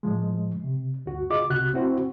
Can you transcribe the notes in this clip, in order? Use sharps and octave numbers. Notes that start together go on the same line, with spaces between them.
A2 F3 G#3
C3
D2 G2 F#4
F4 G#4 D#5 D6
C2 C3 F#4 F#6
C4 E4 F#4 C5